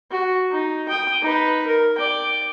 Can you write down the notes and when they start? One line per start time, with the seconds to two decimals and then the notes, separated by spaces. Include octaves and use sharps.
0.11 F#4
0.52 D#4
0.89 G5 D#6
1.22 D#4 B4
1.67 A#4
1.98 D5 G5